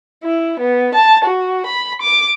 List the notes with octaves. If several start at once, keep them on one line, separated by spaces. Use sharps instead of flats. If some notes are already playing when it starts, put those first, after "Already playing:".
E4
B3
A5
F#4
B5
D6